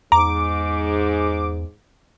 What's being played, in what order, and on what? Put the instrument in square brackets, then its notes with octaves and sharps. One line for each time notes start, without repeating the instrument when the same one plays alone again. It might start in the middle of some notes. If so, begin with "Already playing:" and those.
[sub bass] E2 [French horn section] G#2 [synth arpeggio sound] A#5 [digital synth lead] D6